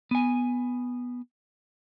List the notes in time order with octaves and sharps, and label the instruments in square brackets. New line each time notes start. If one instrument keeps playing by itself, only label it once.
[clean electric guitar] B3 G#5